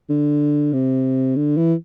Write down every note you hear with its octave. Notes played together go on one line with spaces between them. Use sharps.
D3
C3
D3
E3